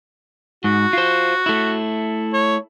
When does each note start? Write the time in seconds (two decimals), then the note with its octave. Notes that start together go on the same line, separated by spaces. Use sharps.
0.64 G#2 F#4
0.93 F4 C5
1.46 A3 E4
2.33 C#5